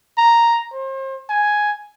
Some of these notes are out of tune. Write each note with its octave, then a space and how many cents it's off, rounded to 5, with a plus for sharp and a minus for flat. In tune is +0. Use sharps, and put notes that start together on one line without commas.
A#5 +0
C5 +35
G#5 +5